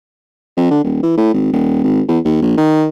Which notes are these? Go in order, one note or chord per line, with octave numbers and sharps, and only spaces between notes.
F2
D3
D#1
E3
A2
G#1
D#1
G#1
E2
D#2
A#1
D#3